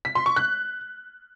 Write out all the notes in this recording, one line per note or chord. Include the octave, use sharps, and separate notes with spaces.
B6
C6
C#6
F#6